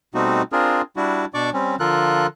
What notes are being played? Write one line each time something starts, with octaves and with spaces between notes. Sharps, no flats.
B2 G3 A3 C4 D#4 F#4
C4 D4 F4 G#4 A#4
G3 D4 E4 F#4
B2 D4 D5 C#6 D6
G3 C4 C#4
D3 F3 F4 A4 A#4 F#6